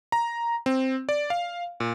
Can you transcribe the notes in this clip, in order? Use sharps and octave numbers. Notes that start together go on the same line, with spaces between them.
A#5
C4
D5
F5
A#2